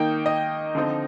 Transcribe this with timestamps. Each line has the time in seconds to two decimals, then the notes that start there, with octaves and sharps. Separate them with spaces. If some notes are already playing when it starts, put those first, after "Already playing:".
Already playing: D#3 A#3 D#4 G5
0.26 D#5
0.75 D3 F3 C4 D#4